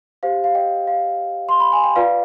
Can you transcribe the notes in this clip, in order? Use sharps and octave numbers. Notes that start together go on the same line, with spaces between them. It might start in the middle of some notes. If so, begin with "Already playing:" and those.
G4 C5 F5
F5
D#5 G5
F5
C6
B5
G#5
G5
F4 B4 D5 F5